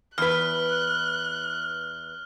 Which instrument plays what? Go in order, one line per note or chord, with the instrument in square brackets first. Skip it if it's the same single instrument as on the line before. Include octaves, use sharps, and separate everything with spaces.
[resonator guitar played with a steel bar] E2 B4 [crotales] F6 [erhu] F#6